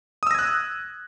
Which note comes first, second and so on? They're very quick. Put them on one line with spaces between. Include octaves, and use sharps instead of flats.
D#6 E6 A#6 G#6 F#6